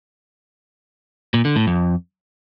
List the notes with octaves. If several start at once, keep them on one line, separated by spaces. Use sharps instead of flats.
A#2
D3
A2
F2